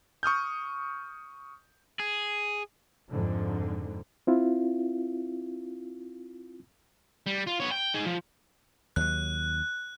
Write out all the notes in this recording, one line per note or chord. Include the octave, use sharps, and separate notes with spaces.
C#6 D#6 F6 G6
G#4
F2 G#2 D3
C4 E4 F4
G3
F4
B3 C#5
G5
D#4 G#4
F3
D#2 F#3 F#6